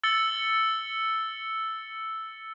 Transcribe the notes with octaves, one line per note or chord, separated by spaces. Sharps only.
E6 A6 C#7 G7